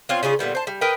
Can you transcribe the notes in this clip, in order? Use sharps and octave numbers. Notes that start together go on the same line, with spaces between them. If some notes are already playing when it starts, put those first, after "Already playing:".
C4 D4 F4 C#5
C#3 C#4 F4 G#4
A#2 D3 G3 B3
C5 A5
G3
A#4 B4 D#5 G5